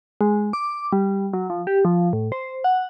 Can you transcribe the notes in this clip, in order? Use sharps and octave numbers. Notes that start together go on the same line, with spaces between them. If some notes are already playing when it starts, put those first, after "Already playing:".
G#3
D6
G3
F#3
F3
G4
F3
A2
C5
F#5